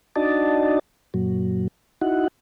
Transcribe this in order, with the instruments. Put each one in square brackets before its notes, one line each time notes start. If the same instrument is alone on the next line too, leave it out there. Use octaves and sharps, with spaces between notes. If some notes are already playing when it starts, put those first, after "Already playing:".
[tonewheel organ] D4 D#4 F#4 D5 D#5 A5
F#2 A#2 F#3
D#4 E4 F#4 F#5